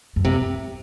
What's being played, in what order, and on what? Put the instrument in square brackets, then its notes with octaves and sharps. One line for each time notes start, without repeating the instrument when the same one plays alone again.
[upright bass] F#2
[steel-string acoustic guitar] C3